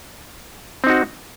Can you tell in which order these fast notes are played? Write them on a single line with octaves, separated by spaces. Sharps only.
C4 D#4 F#4